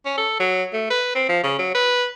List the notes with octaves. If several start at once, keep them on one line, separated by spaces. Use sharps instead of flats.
C#4
A4
F#3
A3
B4
C4
F3
C#3
F#3
B4